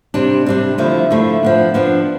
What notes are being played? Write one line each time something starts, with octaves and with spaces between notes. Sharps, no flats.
C3 G3 D4
C3 G3 D4
D3 F3 A3 E4
D3 F3 A3 E4
F3 B3 D4
F3 B3 D4